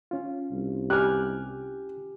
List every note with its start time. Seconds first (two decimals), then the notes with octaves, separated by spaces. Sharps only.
0.11 C#4 F4
0.52 C2
0.90 G4 G#5 F6 F#6